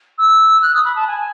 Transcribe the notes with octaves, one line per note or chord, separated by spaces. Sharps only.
E6
F#6
D#6
B5
A5
G#5